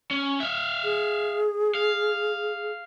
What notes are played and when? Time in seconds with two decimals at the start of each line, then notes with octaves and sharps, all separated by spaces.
0.11 C#4
0.40 E5 F5
0.84 G#4
1.75 F5